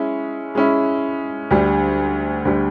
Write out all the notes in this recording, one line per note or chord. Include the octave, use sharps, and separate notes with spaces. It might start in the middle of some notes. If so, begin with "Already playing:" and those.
Already playing: G#3 C#4 E4
G#3 C#4 E4
D2 D3 G3
D2 D3 G3